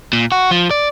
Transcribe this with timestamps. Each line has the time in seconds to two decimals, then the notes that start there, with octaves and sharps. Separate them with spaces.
0.13 A#2
0.32 F#4
0.51 F3
0.71 D5